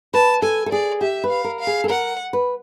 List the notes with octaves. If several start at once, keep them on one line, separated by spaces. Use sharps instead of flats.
B4 A5
A4 G#5
A4
G#4 D5
G4 E5
B4
F5
A#4
F5
G#4
A4
A#4 F#5
B4